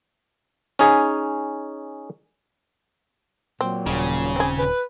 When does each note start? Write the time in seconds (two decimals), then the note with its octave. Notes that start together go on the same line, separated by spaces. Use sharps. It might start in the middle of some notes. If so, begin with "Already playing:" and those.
0.79 C#4 D#4 G#4 G#5
3.61 A#2 F#3 C4
3.87 D#1 C#3
4.36 C4 G#4
4.59 B4